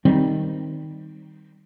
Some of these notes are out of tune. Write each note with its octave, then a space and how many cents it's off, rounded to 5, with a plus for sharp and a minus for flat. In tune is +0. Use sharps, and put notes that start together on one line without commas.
D#3 +0 G3 +0 C4 +0